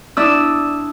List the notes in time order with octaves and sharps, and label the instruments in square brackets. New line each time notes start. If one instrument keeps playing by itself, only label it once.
[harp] D4 E4 D#6 E6